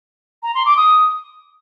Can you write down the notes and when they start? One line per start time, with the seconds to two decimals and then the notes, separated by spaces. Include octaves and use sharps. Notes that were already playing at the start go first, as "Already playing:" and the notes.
0.43 A#5
0.55 C6
0.66 D6
0.77 D#6